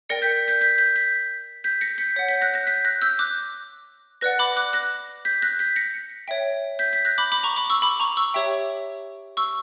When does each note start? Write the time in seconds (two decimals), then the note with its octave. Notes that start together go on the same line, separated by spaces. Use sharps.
0.09 A#4 D5 G5 A#6 C#7
0.22 G6 B6
0.48 G6 B6
0.61 G6 B6
0.78 G6 B6
0.96 G6 B6
1.64 G6 B6
1.81 A#6 C#7
1.98 G6 B6
2.16 C#5 F#5
2.28 G6 B6
2.41 F#6 A#6
2.54 F#6 A#6
2.67 G6 B6
2.85 F#6 A#6
3.02 E6 G6
3.19 D6 F#6
4.21 B4 D5 F#5 F#6 A#6
4.39 B5 D6
4.56 D6 F#6
4.73 F#6 A#6
5.25 G6 B6
5.42 F#6 A#6
5.59 G6 B6
5.76 A#6 C#7
6.28 C#5 E5 G5
6.79 G6 B6
6.93 G6 B6
7.05 F#6 A#6
7.18 B5 D6
7.32 B5 D6
7.44 A#5 C#6
7.56 B5 D6
7.70 C#6 E6
7.82 B5 D6
8.00 A#5 C#6
8.17 C#6 E6
8.34 G4 C#5 E5 G5
9.37 C#6 E6